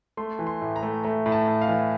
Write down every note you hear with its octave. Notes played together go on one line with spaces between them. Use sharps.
A3 C6
E3
C6
A2
A#5
A3
A3 A#5
A2
A5
A2
F5
E3